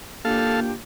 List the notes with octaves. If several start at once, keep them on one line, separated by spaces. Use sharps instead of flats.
A#3 D4 F4 G4 A4 F5